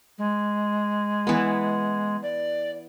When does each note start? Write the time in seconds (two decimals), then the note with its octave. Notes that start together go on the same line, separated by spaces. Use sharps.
0.18 G#3
1.27 E3 B3
2.23 D5